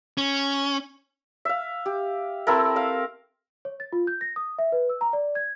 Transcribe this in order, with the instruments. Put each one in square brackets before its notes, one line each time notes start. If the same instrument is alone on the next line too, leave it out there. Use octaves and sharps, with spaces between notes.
[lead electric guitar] C#4
[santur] E5 F5
G4
C4 E4 A4 A#4
E5 F5
[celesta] C#5
A6
F4
G6
A#6
D#6
E5
B4
E6
A#5
D5
G#6